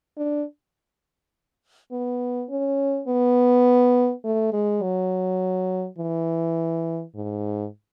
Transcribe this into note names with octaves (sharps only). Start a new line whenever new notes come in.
D4
B3
C#4
B3
A3
G#3
F#3
E3
G#2